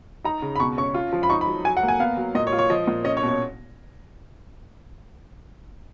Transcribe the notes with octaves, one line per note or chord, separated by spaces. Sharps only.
D#4 A#5
C#3
B5
B2 C#6
C#4 C#6
F4
F3
B5
D#4 C#6
B5
F#3
F#3 G#5
F#5
A#3
G#5
B3 F5
F#3
A#2 D#5
C#5
F4
C#5
F3 D#5
A#2
C#4 D#5
C#5
B2
C#5